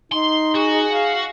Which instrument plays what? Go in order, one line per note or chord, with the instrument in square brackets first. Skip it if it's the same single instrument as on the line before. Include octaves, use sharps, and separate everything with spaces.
[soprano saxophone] D#4 [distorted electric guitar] C6
[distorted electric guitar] F#4 [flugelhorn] G#4
[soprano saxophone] F5